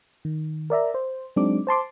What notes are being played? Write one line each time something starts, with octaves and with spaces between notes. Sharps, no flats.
D#3
A#4 D5 E5 A#5
C5
F#3 G#3 C4 D4 D#4 D6
C5 A5 C6 D6